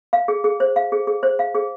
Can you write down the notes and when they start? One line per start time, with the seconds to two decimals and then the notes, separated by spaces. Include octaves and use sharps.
0.13 F5
0.28 G#4
0.44 G#4
0.60 C5
0.76 F5
0.92 G#4
1.07 G#4
1.23 C5
1.39 F5
1.55 G#4